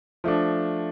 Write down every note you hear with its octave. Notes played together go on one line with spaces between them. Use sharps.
F3 A3 D4